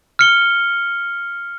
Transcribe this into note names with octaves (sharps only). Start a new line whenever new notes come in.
F6 C#7 G7